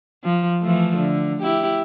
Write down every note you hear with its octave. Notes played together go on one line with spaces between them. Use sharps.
F3
E3 F3 A3
D3
E4 G4